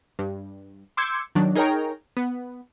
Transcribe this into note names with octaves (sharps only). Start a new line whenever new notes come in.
G2
C6 D6 E6 G6 G#6 C#7
D#3 F#3 D4
D#4 G#4 A#4 C#5 G5 A#5
B3